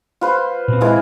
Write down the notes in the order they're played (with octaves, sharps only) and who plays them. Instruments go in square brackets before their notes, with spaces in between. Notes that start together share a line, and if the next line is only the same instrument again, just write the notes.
[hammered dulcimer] F4 B4 C5
[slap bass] A#2 C4
[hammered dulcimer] E3 G#3 F4